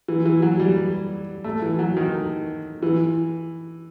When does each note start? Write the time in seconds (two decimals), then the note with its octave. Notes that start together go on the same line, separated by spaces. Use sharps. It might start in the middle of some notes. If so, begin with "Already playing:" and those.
0.08 E3
0.25 E3
0.42 F#3
0.60 G3
1.44 A3
1.62 E3
1.79 F#3
1.97 D#3
2.83 E3